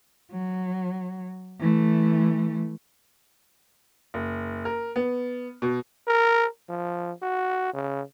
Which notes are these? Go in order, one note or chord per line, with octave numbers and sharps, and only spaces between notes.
F#3
E3 A3
F#1
A#4
B3
B2
A#4
F3
F#4
C#3